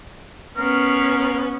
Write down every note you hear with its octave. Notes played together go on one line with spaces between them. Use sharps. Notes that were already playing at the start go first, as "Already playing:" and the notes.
B3 C#4 A#4 F5 F6